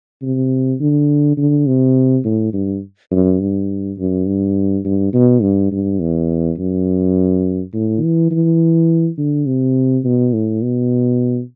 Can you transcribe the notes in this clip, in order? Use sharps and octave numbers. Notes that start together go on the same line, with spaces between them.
C3
D3
D3
C3
A2
G2
F#2
G2
F#2
G2
G2
B2
G2
G2
E2
F#2
A2
E3
E3
D3
C3
B2
A2
B2